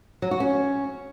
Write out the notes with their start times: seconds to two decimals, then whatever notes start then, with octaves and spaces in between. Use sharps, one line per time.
0.22 F#3
0.31 F#4
0.40 C#4